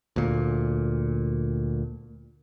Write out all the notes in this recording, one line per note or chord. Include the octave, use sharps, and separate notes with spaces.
D2 A#2